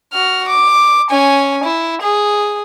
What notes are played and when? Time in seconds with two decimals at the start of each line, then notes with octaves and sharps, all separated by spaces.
0.13 F#4 F6
0.48 D6
1.11 C#4 G#5
1.64 E4
2.02 G#4